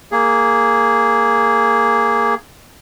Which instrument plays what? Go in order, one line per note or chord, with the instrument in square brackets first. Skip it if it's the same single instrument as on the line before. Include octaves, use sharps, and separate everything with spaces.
[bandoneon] A#3 G#4